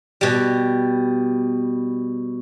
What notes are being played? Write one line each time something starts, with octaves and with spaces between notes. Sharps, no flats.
B2 G3